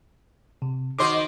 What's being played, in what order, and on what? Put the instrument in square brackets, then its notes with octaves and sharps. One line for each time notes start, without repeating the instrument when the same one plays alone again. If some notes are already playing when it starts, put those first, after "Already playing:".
[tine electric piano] C3
[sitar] D#3 C5 D#5 [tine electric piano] F#4 C6 D6